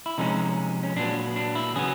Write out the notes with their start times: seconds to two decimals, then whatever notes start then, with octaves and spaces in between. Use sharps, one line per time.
0.06 E4
0.18 C3 F3 G#3 C#4 D#4
0.83 C#4
0.96 A#2 F#3 B3 D4
1.36 D4
1.55 E4
1.75 C#3 F#3 B3 G#4